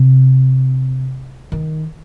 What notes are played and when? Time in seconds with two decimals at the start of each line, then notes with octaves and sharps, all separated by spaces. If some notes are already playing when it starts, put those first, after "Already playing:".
Already playing: C3
1.52 D#3